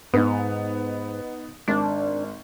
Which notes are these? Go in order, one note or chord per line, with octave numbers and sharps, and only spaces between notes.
G#2 B3 D#4
G#1 D4